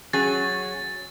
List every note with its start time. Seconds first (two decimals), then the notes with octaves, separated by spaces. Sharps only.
0.13 F#3 C#4 G#4 A6